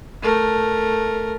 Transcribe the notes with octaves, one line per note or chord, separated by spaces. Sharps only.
A3 A#4